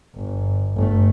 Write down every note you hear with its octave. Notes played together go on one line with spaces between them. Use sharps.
G1
G1 A3